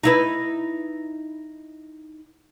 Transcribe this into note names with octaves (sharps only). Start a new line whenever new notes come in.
D#4 E4 B4